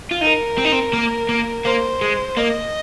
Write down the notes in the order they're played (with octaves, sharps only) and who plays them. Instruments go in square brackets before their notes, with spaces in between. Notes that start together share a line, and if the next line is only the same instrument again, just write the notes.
[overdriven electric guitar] F4
[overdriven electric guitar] D#4 [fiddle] A#4
[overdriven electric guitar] C4
D#4
C4
A#3
A#3
[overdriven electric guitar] A#3 [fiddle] C5
[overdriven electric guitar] G#3
[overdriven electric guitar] A#3 [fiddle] D#5